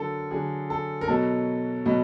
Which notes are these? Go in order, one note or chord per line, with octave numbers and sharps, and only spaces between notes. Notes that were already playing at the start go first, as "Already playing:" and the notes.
Already playing: D3 F#3 A4 A#4
D3 F#3 G#4
A4
A#4
B2 F#3 A4
B2 F#3